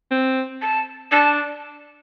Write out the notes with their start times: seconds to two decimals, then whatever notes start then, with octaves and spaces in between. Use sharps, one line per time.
0.11 C4
0.62 A5
1.12 D4 A5